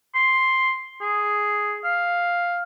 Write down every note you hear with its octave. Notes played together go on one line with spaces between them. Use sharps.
C6
G#4
F5